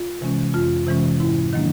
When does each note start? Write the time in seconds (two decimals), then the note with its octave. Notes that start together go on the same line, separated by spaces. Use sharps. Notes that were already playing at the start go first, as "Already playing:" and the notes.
Already playing: F4
0.21 C3 E3 G#3 C#4
0.54 F2 F4
0.87 C3 E3 G#3 C#4
1.20 G#2 E4
1.53 D#3 F#3 A#3 D4